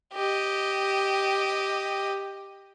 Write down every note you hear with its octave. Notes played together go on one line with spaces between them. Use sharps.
G4 D#5